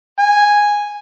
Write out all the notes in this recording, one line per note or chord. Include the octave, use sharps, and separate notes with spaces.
G#5